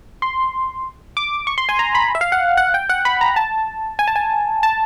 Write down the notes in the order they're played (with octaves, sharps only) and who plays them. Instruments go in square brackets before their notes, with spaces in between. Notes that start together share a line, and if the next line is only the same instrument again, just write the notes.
[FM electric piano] C6
D6
C#6
C6
G#5
A#5
B5
E5
F5
F#5
F#5
G5
F#5
B5
A#5
A5
G#5
A5
G#5
A5